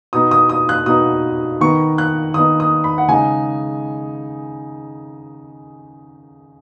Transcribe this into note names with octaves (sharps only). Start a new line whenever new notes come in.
B2 B3 D#4 D#6
D#6
D#6
F#6
B2 B3 D#4 D#6
D#3 B3 D#4 C#6
F#6
D#3 B3 D#4 D#6
D#6
B5
F#5
C#3 G#3 D#4 G#5